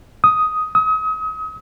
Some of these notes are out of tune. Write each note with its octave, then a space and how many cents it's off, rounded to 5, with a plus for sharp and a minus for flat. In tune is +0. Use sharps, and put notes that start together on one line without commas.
D#6 +10
D#6 +40